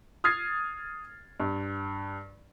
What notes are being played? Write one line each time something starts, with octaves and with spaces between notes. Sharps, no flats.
D#6 F6 G#6 A6 C7
G2